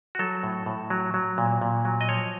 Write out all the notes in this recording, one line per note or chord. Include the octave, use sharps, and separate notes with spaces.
F#4
F#3 A4
A2
A2
F#3
F#3
A#2
A#2
F#3
D#5
F3 C#5